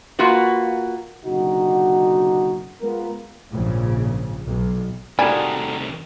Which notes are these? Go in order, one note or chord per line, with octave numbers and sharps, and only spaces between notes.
A#3 F4 F#4 B4
F#1 B2 D3 D#4 F#4
G#3 B3 F4 A#4
A#1 G#2 C#3
B1
C2 D#3 G3 F#4 A4 A#4 G#5